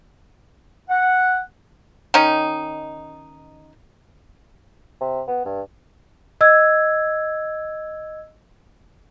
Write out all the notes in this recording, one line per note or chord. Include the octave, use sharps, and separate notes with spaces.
F#5
D#3 C#4 D#4
C3
B3
G2
D#5 E6 G#6